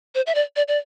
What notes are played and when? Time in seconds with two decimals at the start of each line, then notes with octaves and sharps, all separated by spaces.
0.15 C5
0.27 E5
0.35 D5
0.56 D5
0.68 D5